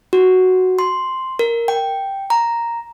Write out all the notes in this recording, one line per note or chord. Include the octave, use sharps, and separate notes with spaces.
F#4
C6
A#4
G5
A#5